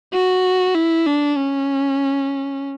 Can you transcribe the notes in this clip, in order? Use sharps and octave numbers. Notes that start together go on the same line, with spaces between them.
F#4
E4
D4
C#4